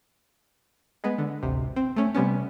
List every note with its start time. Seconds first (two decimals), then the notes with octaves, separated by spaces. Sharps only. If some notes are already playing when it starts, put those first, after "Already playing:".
1.04 G#3 B3
1.18 D3
1.43 A1 D2 C3
1.76 C4
1.96 A3 C#4
2.15 C3 G3 B3 C#4